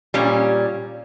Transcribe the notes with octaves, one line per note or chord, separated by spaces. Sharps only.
A#2 G3 C#4